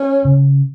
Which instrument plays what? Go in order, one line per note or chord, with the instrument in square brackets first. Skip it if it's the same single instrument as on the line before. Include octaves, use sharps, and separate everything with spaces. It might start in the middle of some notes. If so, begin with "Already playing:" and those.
Already playing: [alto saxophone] C#4
[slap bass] C#3